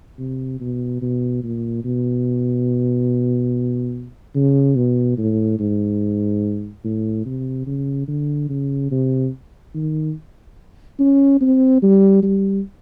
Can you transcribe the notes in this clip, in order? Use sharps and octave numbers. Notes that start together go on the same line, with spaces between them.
C3
B2
B2
A#2
B2
C#3
B2
A2
G#2
A2
C3
C#3
D3
C#3
C3
D#3
C#4
C4
G3
G3